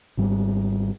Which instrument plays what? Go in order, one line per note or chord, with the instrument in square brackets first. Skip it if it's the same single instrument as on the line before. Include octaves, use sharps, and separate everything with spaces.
[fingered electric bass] G#1 G#2 G3